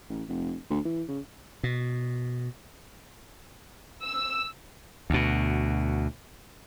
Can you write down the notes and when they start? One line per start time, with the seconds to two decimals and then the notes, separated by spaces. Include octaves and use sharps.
0.09 A1
0.28 F1
0.70 D2
0.85 E3
1.08 C#3
1.63 B2
4.05 E6
5.10 D2 B2